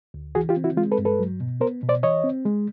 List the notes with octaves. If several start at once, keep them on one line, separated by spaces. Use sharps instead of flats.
D2
E3 F#4 G#4
F4 G4
C4
E4 F#4
G#3 F4
A4 B4
G2
A4 B4
F#3
B2
B3 A#4 C5
B2
C5 D5
E3 C#5 D#5
C4
G#3